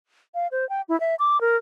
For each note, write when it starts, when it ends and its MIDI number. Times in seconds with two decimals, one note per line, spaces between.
0.35 0.47 77
0.52 0.68 72
0.69 0.82 79
0.89 0.99 64
1.00 1.15 76
1.19 1.40 86
1.41 1.57 70